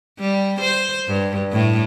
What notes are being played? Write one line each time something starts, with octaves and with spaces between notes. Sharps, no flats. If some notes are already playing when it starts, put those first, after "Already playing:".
G3
C5
G2
A2